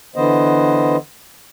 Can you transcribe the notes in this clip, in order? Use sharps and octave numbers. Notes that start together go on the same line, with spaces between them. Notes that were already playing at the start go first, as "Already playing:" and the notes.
D3 E3 B3 C5 D#5